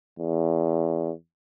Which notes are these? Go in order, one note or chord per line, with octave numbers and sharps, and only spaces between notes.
E2